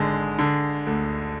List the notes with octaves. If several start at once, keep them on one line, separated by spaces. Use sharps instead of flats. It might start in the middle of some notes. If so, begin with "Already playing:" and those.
Already playing: G#1 D3 G#3
D3
D2